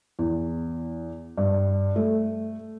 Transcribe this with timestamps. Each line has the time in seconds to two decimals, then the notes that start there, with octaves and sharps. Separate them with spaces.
0.19 E2
1.38 G2
1.96 A3